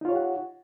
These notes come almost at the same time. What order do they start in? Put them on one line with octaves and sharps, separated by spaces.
D#4 F4 C#5 G4 F#5